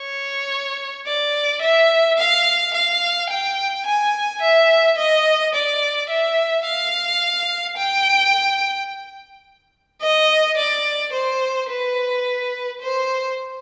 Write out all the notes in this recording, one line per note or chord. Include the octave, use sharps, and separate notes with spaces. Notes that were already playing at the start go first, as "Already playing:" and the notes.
Already playing: C#5
D5
E5
F5
F5
G5
G#5
E5
D#5
D5
E5
F5
G5
D#5
D5
C5
B4
C5